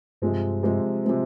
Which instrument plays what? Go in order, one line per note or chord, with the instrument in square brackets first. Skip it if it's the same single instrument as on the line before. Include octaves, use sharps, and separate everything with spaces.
[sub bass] G2 [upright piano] C3 F3 G#3 C4
[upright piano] C3 F3 G#3 C4
C3 F3 G#3 C4